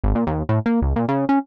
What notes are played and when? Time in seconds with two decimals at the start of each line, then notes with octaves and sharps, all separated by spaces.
0.04 G#1
0.15 A#2
0.27 D#2
0.49 A2
0.66 A#3
0.82 C#2
0.96 A#2
1.08 C#3
1.29 C#4